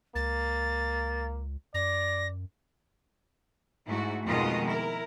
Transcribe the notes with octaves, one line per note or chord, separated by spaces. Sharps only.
C#2 A#3 A6
F#2 D5 A#6
G#2 A3 E4 F#4
F2 B2 D#3 G#3 F4 D#5
E4 A#4